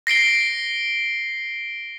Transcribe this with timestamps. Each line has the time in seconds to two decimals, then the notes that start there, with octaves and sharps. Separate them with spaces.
0.07 A#6 C7 D7 G7